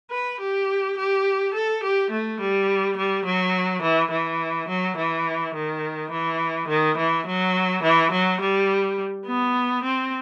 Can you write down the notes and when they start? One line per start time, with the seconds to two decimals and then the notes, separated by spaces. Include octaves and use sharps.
0.11 B4
0.40 G4
0.97 G4
1.54 A4
1.83 G4
2.11 A3
2.40 G3
2.97 G3
3.25 F#3
3.82 E3
4.11 E3
4.68 F#3
4.97 E3
5.54 D#3
6.11 E3
6.68 D#3
6.97 E3
7.26 F#3
7.83 E3
8.12 F#3
8.41 G3
9.26 B3
9.83 C4